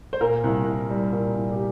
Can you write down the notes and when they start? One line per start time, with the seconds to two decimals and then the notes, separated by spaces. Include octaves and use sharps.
0.13 C5
0.21 A#2 A#4
0.44 C2
0.66 C2
0.90 G3
1.12 A#2
1.36 C2
1.51 G4